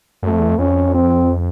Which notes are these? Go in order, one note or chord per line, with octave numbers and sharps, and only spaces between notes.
F#2 A3
F2
E2
F2
F2 C#4
C4